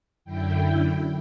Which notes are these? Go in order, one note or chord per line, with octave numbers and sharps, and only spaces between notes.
F#2 D3 E4 G5